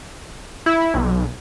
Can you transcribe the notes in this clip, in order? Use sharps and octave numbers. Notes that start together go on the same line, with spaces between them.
E4
B1